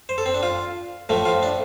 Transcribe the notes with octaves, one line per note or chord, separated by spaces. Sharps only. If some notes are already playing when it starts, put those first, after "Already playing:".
C5
A4
C4
D4
F4
A2 F3 A3
F4
D4